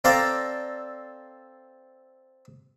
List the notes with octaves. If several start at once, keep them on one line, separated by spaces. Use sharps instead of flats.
C4 A4 D5 F5 A#5